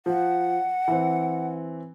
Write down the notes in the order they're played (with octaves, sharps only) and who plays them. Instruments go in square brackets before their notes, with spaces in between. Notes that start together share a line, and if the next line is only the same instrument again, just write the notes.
[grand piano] F3 [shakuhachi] F#5
[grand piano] E3 C4